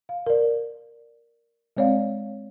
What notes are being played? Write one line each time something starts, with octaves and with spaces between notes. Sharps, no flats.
F5
A#4 D5
G#3 C4 C#5 D5 F5